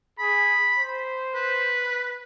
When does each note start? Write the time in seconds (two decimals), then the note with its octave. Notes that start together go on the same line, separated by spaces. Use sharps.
0.19 G#4 B5
0.78 C5
1.34 B4